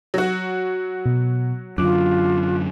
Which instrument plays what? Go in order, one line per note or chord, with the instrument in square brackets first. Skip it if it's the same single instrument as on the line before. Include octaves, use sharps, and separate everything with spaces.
[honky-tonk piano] F#3 F#4
[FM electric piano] B2
[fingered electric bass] F#2 D3 [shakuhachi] F4 [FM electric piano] D6 F#6